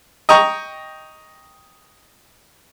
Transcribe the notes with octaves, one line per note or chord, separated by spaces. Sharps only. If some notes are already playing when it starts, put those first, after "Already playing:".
D#5 G5 A#5 C#6